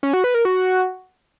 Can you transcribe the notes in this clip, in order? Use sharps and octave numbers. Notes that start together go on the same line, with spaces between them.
C#4
F#4
B4
A#4
F#4